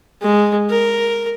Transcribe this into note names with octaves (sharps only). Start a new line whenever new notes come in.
G#3
A#4